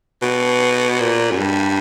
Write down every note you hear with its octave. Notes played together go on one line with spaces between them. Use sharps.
B2
A#2
F#2
G2